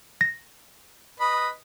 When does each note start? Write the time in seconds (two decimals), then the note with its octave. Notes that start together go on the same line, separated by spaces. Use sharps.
0.21 A#6
1.20 B4 D#5 B5